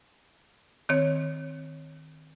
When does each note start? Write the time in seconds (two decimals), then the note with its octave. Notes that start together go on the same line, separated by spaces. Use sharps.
0.89 D#3 C4 C#5